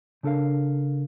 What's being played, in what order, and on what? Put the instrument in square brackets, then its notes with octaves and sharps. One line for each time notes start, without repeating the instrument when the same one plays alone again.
[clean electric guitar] C#3 D4 A4 A#4 F5